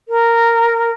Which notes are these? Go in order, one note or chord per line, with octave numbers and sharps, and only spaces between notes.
A#4